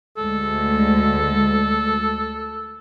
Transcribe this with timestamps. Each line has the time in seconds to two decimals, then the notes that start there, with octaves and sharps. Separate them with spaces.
0.18 D2 G#3 A4